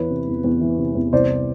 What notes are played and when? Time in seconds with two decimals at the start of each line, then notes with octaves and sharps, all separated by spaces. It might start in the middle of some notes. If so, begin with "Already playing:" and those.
Already playing: E2 E3 B4 C#5
0.10 C3
0.27 E2
0.44 E2
0.61 E3
0.78 C3
0.95 E2
1.13 C2 C5 D5